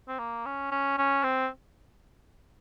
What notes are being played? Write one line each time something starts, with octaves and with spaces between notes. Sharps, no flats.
C4
A#3
C#4
C#4
C#4
C4